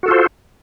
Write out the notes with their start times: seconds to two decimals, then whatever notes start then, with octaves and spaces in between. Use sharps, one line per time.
0.03 F#4
0.06 A4
0.08 F4
0.11 C5